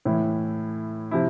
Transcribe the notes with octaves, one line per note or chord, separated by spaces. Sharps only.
A2 E3 E4
C3 F3 E4